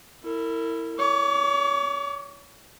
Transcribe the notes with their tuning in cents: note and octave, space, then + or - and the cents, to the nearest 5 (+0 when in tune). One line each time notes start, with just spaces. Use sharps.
E4 +0 A#4 -35
C#5 +30 D6 -25